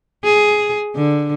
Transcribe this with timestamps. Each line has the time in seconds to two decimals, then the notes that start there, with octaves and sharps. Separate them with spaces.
0.24 G#4
0.96 D3